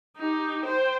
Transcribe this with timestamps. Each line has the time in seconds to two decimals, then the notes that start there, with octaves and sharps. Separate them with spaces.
0.17 D#4 G4
0.64 C5 G5